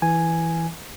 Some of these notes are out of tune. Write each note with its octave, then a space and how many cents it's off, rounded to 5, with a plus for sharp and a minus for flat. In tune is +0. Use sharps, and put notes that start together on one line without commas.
E3 +0 G#5 +0